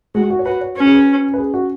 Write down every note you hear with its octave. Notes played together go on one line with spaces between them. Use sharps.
G#3 F#4
F#4
C#5
F#4 B4
C#5
C#4 B4
G#4
B4
B4
G#4
F#4